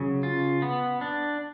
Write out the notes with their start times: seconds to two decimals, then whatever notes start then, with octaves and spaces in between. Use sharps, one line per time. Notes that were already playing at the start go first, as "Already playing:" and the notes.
Already playing: C#3 F#3
0.23 F4
0.62 B3
1.01 D4